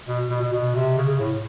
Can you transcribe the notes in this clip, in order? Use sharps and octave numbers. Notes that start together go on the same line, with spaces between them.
B2
B2
B2
B2
C3
C#3
C#3
A2